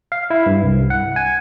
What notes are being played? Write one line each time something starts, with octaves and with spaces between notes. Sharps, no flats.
F5
E4
G2
C2
F#5
G#5